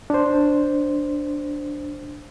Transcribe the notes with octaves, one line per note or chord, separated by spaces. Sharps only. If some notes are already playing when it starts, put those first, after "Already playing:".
D4 C5